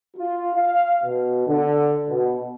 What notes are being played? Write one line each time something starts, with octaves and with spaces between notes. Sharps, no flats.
F4
F5
B2
D3
B2